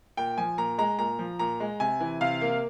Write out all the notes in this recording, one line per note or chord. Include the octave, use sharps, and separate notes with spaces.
A#2 G5
F3 G#5
A#2 A#5
G#3 A#5
A#2 A#5
F3
A#2 A#5
G#3
C3 G#5
E3
C3 F5
A#3